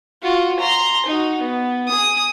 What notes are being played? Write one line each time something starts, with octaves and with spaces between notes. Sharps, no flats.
F4 F#4
A#5 C6
D#4 F#4
B3
G#4 D#6